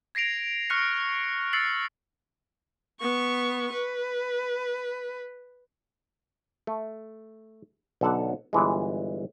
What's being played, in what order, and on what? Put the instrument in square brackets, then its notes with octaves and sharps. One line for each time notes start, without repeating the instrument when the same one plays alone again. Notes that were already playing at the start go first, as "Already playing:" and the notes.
[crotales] G#6 A#6 C7 D7 F7
C#6 F6 F#6 A#6 C#7
E6 A6 C7 C#7 F#7
[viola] B3 C#6
B4
[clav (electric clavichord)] A3
B1 D3 A4 F#5 A5
G1 E3 G#3